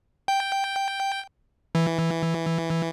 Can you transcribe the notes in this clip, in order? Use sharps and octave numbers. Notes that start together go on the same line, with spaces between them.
G5
E3